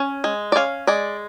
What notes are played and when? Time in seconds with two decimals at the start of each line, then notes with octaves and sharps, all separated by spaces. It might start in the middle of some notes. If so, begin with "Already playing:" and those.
Already playing: C#4
0.24 G#3
0.52 D5
0.56 C#4 F5
0.87 G#3 D5